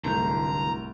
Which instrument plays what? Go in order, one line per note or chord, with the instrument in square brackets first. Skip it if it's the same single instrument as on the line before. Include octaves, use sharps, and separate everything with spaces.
[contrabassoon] D1 [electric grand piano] C2 G#2 A3 [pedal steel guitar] D3 G6 [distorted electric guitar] A#5